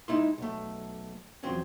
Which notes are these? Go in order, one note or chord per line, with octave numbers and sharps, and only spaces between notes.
G#3 D#4 E4 C6
B1 A3
E2 F3 F#3 C4 C#4